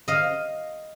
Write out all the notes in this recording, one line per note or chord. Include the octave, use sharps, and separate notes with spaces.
D#5 F5